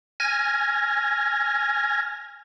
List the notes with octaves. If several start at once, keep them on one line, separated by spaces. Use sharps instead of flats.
G#5 F6 G#6 A#6